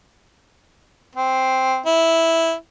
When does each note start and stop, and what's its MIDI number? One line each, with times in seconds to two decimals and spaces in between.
1.16 1.80 60
1.86 2.53 64